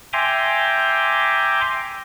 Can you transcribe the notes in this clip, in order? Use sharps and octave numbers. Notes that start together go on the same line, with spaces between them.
E5 G5 G#5 A#5 C6 D6